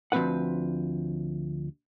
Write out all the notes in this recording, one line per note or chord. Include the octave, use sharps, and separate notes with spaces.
D2 F3 A3 C4 B4 F#5